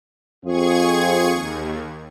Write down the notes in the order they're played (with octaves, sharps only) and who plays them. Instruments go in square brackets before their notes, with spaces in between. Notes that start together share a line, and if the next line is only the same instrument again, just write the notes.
[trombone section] F2 C4 F4 [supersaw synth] G#4 C#6 G#6
[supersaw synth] D#2